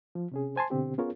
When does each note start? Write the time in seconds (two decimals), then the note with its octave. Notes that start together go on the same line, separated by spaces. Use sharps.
0.15 F3
0.32 C3 C#4 G#4
0.56 C5 G#5 A5 C6
0.70 B2 D3 C4 G4
0.98 B3 C#4 F4 G#4 A#4 C#5